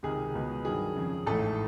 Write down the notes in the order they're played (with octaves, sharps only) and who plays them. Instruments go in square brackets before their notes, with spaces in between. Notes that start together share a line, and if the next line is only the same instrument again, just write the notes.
[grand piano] C#2 C3 D#3 G#3 G#4
C#2 B2 G#3 B3
G2 D#3 F#3 G#4
F2 C#3 F3
A1 G#2 E3 A3 A4